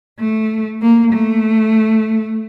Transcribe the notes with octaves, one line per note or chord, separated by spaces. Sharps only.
A3
A#3
A3